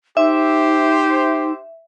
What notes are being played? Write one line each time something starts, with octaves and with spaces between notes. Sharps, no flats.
D#4 G4 C5 E5